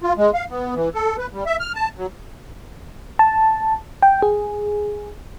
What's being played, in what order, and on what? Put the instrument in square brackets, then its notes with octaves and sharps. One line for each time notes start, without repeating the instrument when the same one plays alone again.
[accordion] F4
G#3
F5
B3
E3
A4
B4
G3
E5
F6
A5
F#3
[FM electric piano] A5
G5
G#4